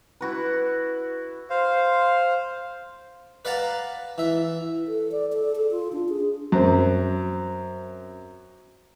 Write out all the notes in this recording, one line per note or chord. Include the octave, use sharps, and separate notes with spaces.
E4 F#4 B4
C5 F5
B4 D5 F5 F#5 A5 A#5
E3 E5
A4
D5
A4
A4
F4
D4
G#4
F#2 C4